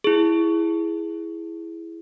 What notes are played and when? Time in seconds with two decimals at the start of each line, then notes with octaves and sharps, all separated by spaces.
0.04 E4 G#4